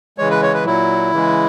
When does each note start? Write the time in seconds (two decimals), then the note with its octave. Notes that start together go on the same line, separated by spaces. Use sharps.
0.18 C#3 E3 G#3 C#5
0.31 B4
0.42 C#5
0.54 B4
0.64 A#2 F#3 E4
1.12 C#3 E3 G#3